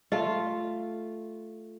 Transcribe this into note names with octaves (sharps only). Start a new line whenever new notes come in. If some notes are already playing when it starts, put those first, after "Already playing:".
A3 F4